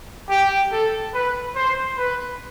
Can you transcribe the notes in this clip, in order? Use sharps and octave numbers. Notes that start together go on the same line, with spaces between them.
G4
A4
B4
C5
B4